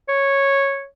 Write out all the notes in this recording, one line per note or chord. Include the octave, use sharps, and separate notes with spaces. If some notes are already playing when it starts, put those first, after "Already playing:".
C#5